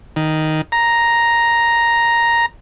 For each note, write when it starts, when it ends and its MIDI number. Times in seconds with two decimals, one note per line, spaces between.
0.16 0.61 51
0.72 2.46 82